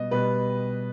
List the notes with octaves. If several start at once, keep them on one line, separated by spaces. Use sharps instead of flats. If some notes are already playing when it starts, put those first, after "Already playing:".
Already playing: B2 G3 D#5
B2 G3 B4